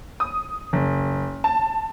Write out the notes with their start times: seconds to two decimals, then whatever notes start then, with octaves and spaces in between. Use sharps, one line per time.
0.20 D#6
0.73 F#1
1.44 A5